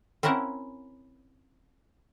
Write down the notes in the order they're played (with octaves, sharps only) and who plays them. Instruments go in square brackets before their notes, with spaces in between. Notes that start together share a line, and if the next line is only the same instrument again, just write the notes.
[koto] C4 C#4 E4 A#4 F#5